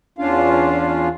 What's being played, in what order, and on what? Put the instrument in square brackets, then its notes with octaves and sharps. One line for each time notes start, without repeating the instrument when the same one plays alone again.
[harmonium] E2 C#4 D4 F4 F5